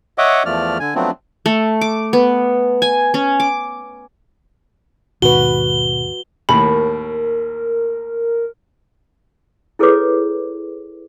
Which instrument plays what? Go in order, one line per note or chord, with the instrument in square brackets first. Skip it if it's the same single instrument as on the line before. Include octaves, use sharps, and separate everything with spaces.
[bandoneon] C#5 D#5 E5 F#5 D6
E2 F3 A3 D5 F6
D3 G#5
F3 F#3 A3 B3 C4 D4
[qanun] A3
D6
B3
G#5
C#4
D6
[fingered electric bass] D#2 G#2 D#3 [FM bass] B2 [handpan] F#4 B4 [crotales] G7
[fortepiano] D#2 A2 [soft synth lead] A#4 [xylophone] B5
[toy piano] E4 G#4 A4 B4 C#5 D6